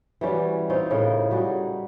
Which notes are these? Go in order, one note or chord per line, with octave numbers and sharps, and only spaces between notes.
E3 G3 C#4 F#4
C4 D#4 F4 C#5
A2 C#3 A#4
G3 F#4 G#4